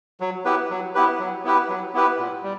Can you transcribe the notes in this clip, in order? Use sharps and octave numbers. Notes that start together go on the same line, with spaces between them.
F#3
B3 E4 G4 B4
F#3
B3 E4 G4 B4
F#3
B3 E4 G4 B4
F#3
B3 E4 G4 B4
A#2
G3